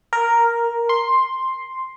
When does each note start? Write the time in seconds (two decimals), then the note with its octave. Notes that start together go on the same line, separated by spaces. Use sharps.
0.13 A#4
0.89 C6